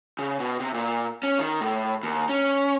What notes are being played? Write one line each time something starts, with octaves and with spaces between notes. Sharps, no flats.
C#3
B2
C3
A#2
C#4
D#3
A2
D#2
C#4